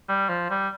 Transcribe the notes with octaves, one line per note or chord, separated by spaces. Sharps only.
G3
F3
G3